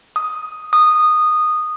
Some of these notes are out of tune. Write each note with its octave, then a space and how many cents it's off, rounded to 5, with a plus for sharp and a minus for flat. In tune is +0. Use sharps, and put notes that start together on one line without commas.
D#6 +5
D#6 -15